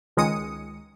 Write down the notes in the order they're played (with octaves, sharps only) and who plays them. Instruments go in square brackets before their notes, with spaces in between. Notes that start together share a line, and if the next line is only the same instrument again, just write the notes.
[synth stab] C#2 D#3 G#3 D#6 C#7